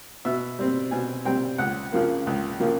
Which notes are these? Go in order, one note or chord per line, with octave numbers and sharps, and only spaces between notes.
B2 E5
G3 C4
B2 G#5
G3 C4 G5
C#2 F#5
C#3 F3 A#3
C#2
C#3 F3 A#3